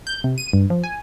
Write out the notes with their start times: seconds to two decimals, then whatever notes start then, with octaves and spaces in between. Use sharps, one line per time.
0.07 G6
0.24 C3
0.38 D#7
0.53 G2
0.70 F3
0.84 G#5